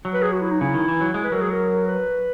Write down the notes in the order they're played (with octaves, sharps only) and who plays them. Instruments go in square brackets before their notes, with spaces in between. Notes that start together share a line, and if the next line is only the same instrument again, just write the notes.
[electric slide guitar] F#3
[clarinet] B4
G#4
F#4
E4
D#4
[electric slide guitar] C#3 [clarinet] E4
[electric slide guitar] D#3
E3
F#3
G#3
[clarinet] B4
[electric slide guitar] F#3 [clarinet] A#4
[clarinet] G#4
A#4
B4